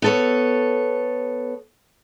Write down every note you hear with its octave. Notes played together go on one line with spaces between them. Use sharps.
B3 A4 C#5